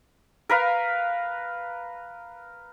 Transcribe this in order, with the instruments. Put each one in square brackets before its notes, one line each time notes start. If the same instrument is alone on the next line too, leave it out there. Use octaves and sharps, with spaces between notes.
[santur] A#4 B4 F5